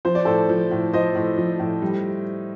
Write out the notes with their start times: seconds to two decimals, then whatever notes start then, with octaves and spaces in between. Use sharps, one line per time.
0.05 F3 C5
0.15 D5
0.25 A2 A4 C5
0.49 F3
0.71 A2
0.93 F3 C5 D#5
1.15 A2
1.38 F3
1.60 A2
1.82 G3